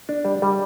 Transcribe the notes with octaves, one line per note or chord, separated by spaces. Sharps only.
D4
G3
G3